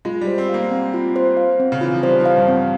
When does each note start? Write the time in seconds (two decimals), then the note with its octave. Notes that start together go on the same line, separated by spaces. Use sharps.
0.05 G#3 F4
0.21 G3
0.27 C5
0.38 C4
0.49 A#3 F5
0.71 C4
0.94 F4
1.16 C5
1.37 F5
1.60 C4
1.72 C#3
1.81 E3 F4
1.93 F3
2.03 G3 C5
2.20 F3
2.26 F5
2.37 G2
2.48 C4